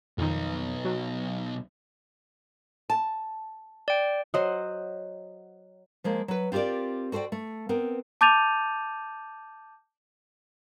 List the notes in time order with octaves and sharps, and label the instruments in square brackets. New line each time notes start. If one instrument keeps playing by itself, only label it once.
[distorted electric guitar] B1 D#4 [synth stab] F2 D#3
[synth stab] F#3
[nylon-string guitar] A5
[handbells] D5 G5
[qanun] F#3 C5 [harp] D#5 F#5 D#7
[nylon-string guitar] F3 G#3 A#3
F#3 B4
C4 F4 G4 A#4 D5
F#4 A4 C5 D5 G5
A3
B3 C4 A#4
[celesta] A5 D6 G6 A6 D#7 F7